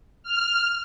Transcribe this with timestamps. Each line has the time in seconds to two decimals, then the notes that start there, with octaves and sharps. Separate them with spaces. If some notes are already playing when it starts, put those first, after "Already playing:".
0.23 F6